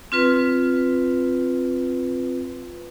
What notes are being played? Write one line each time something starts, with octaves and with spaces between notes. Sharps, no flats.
C4 F4 B4